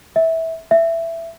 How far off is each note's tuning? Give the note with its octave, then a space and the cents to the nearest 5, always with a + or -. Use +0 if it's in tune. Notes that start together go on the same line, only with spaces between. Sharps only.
E5 -20
E5 +10